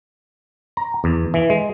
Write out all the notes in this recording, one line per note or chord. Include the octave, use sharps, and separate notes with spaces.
A#5
E2
E3
G#3